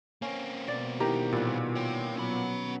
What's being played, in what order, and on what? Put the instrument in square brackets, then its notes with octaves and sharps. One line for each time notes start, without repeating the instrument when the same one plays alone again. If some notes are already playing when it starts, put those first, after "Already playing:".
[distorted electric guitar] A#3 C4 [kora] C#4
[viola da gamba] B2 [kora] D5
[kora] D#3 E3 [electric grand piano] G4 A#5
[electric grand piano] A#2 [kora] G3 F#5
[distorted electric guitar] C#5 G5
[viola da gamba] B2 F#3 B3 [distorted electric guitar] C#4 B5